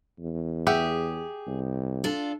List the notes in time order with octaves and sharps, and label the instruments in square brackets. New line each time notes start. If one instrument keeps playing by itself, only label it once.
[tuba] E2
[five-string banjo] G4 E5 F#5 [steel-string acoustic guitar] G#4
[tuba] C2
[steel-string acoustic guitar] D4 F4 A4